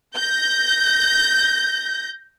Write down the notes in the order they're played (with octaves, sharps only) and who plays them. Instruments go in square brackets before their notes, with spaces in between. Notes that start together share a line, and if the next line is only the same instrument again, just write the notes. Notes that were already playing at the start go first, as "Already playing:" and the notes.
[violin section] G6 A#6